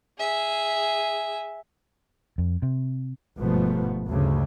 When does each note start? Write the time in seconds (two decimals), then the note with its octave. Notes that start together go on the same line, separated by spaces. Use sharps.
0.19 G#4 E5
2.38 F2
2.62 C3
3.38 G1 G#2 B2 F3 A3 B3
4.08 D2 G2 C#3